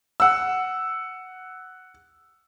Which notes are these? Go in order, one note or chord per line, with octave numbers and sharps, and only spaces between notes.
F#5 E6